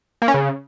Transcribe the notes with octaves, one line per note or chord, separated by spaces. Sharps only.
A#3
C#4
C#3